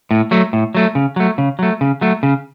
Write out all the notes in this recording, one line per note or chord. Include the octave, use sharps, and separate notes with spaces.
A2
F#3 A3
A2
F#3 A3
C#3
F#3 A3
C#3
F#3 A3
C#3
F#3 A3
C#3